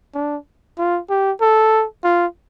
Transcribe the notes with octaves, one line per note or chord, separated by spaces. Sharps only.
D4
F4
G4
A4
F4